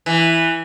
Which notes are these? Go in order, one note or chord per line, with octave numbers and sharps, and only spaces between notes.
E3